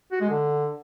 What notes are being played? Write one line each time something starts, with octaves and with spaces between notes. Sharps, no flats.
F#4
G#3
D3